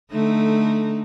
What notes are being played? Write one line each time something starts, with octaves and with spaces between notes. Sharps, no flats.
D3 A3 D#4